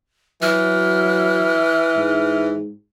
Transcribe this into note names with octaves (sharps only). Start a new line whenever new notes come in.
E3 F#3 F6
G#2